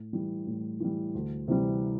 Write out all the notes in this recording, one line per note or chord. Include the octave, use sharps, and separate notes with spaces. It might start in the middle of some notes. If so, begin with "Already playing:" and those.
Already playing: A2
E3 G3
A2
E3 G3
D2
C3 E3 G3